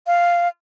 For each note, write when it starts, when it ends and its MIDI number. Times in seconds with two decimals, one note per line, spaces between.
0.07 0.48 77